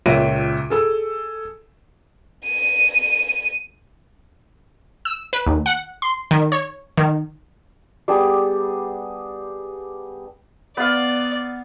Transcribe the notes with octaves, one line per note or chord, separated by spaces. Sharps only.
C#2 A#2 C#5 E5 D7 D#7
G#4 A4 E6
D#7
E6
B4
D#2
F#5
C6
D#3
C#5
D#3
G3 B3 D4 G#4
B3 D5 F5